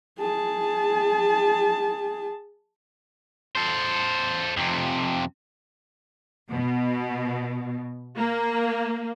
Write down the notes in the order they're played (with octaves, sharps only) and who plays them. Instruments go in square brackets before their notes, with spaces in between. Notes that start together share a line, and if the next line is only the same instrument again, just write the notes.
[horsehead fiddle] G#4 A5
[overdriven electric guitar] A4 C5
F2 C3
[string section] B2
A#3